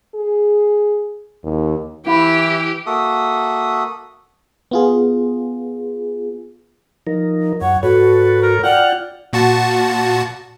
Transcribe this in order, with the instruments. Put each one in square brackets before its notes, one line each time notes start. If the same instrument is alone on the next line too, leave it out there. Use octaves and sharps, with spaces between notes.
[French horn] G#4
D#2
[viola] E3 [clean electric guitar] E4 [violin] G4
[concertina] A#3 F#4 A4 E5 D#6
[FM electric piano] B3 F4 G#4
[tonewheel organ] F3 D#4 A#4
[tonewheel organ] F#2 [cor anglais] C#5 [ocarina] F#5
[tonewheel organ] G#2 A4 C#5 [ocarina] F#4 [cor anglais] B4
[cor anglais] A#4
[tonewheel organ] F4 G5 F6 [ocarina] D5 [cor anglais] F#5
[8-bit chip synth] A#2 F#4 A5